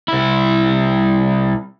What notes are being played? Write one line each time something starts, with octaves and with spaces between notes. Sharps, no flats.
C2 E4